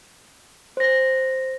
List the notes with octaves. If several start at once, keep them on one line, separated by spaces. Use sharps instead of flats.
C5 A#6